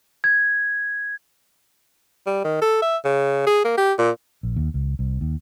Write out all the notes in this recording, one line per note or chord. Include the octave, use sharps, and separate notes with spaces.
G#6
G3
D#3
A4
E5
C#3
G#4
A#3
G4
A#2
A#1
D#2
C#2
C2
D#2